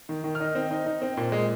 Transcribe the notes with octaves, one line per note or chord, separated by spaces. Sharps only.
D#3
D#3
F6
D#4
C4
D#4
D#4
C4
A#2
G#3